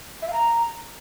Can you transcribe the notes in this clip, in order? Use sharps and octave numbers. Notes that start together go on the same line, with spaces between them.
E5
F5
A#5